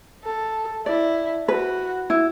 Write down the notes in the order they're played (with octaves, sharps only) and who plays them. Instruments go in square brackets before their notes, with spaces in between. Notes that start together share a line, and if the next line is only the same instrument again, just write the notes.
[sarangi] A4
[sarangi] E4 [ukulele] D5
[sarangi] F#4 [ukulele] B4
[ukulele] E4